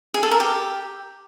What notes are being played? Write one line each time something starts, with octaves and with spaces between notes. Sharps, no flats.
G#4
A4
A#4
G4